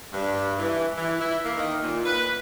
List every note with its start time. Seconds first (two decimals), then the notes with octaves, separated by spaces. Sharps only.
0.13 G2
0.59 E3
0.97 E3
1.21 E4
1.45 A#3
1.57 D#3
1.83 A#2
2.06 B4